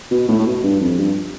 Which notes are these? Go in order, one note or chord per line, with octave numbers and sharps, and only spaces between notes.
B2
A2
A2
B2
G2
F2
G2